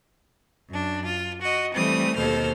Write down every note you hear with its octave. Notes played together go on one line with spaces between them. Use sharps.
F#2 D4
F4
F#4 D#5
E3 G3 A3 C4 D#6
D#2 B2 A4 C5 F6